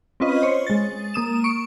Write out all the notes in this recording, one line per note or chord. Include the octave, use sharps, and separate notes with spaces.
C4 C#4 F4 B4 D#5
C5 C#5
G#3 A6
A#3 D#6 E7
C#6 D7